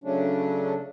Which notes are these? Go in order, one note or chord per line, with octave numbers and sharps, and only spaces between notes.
C#3 F#3 A3 C#4 D4